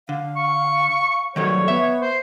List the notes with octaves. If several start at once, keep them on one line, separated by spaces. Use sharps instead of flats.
D3 F5
C#6
D#3 F#3 G3 A4 C#5
B3 E5
C5